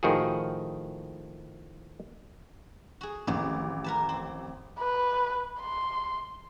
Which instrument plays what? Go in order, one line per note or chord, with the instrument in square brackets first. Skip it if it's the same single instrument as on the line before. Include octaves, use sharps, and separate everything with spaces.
[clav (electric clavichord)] A2 D#3 F3 F#4 G#4
[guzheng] F#4 G#4
[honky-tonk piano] A1 [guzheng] F2 D#3 G#3
[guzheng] A#4 B4 A5
C4
[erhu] B4
C6